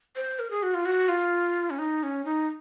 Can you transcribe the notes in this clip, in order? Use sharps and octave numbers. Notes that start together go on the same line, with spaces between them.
C5
A#4
G#4
F#4
F4
F#4
F4
C#4
D#4
C#4
D#4